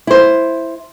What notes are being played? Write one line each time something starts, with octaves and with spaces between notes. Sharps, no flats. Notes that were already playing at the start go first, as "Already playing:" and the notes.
E4 C5